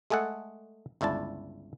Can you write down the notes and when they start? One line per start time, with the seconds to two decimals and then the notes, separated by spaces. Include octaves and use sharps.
0.10 G#3 A3 G#4 A4 F#5
1.01 G1 C#2 E4 D5 A5